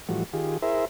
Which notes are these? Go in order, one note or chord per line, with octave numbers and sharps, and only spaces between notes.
A2 E3 F3 G3 F#4
D#3 F4 G4 G#4
E4 G#4 A#4 C5 E5